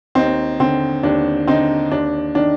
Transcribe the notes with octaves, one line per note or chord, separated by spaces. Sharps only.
D#2 C4 D#4
D3 C4
D#2 D4
D3 C4 D#4
D#2 D4
D#3 D4